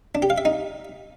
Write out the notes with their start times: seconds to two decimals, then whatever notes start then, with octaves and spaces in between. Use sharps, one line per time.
0.15 D4
0.22 G4
0.30 F5
0.38 E5
0.45 D#4